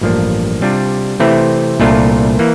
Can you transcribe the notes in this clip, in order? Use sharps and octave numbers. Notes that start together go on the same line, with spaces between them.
A1 G2 F3 A#3 D4
C3 G3 D4 F4
C3 E3 A3 C4 E4
C2 A#2 A3 D4 F4
E3 A#3